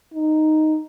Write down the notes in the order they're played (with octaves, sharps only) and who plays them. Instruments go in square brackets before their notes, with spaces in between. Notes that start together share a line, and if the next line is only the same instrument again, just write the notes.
[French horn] D#4